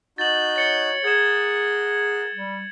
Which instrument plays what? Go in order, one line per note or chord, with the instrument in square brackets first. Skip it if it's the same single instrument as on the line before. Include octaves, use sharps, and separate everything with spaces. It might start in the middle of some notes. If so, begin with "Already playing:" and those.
[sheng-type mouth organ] D#4 F#4 G6 [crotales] A6 F#7
[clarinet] C#5 [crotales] A6 C#7 G7
[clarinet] G#4 [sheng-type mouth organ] A#4 F#5 [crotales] G#6 E7
[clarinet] G3